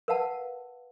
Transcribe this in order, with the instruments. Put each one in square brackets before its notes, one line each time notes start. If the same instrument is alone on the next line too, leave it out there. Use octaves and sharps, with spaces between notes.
[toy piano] A#4 B4 F5 F#5 A5